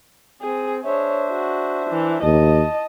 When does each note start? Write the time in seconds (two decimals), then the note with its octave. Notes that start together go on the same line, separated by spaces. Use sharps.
0.42 C4 G#4
0.85 D4 C5 C#5 E5
1.31 F#4
1.90 E3
2.23 D#2 D#5 A5